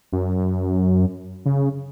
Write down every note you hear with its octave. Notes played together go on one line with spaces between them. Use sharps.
F#2
C#3